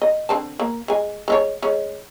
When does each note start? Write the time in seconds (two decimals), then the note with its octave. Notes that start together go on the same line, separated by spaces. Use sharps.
0.02 D#5
0.29 D3 C4 A5
0.60 A#3
0.88 G#3 G#5
1.28 G#3 A4 C#5
1.62 G#3 C#4